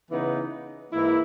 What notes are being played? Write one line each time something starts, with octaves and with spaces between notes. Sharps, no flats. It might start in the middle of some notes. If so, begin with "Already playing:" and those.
C#3 E3 B3 D#4
G#2 E3 A#3 E4